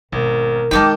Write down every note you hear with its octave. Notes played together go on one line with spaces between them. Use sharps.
G#1 B2 A#4
D#3 G#3 D#4 D#5 G5 A5 D6 F6